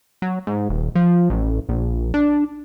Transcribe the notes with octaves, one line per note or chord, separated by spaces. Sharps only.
F#3
G#2
D#1
F3
A1
A#1
D4